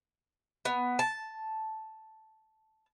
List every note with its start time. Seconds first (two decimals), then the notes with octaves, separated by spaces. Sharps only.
0.65 B3
0.99 A5